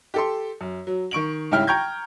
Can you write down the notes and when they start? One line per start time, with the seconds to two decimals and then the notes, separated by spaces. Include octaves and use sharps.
0.14 G4 A4 C6
0.61 F#2
0.87 F#3
1.11 D#3 C#6 D7 F#7
1.51 C2 G#2 C#3 E4 G5 F6
1.67 G5 A#5 C#6 G6 G#6